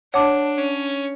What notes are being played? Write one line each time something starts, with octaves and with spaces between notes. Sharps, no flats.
D4 C#5 F#5 A5 D6
C#4